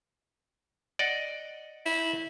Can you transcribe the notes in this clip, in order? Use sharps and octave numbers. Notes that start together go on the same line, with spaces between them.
D5 D#5 F#5
E4